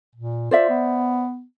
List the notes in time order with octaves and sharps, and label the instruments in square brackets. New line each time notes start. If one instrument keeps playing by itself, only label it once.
[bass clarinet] A#2
[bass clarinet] F4 [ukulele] C5 D5 E5
[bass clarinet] B3